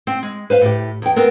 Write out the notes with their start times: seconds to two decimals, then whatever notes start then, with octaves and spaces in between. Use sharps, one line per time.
0.07 C4
0.23 G#3
0.50 B4 C5 F5
0.61 A2 G4
1.02 E2 G5
1.16 B3 C4 A#4